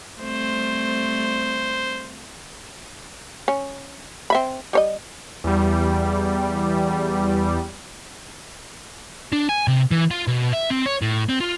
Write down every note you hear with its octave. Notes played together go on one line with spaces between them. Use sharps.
G3 A3 C4 C5
C#4
C4 E5 B5
G3 C#5 D#5
E2 G3
D4
G#5
C3
E3
F4
B2
E5
C4
C#5
A2
C4
F4